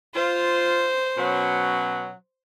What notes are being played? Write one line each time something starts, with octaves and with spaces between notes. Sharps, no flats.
F4 C5
B2 F#3 C#4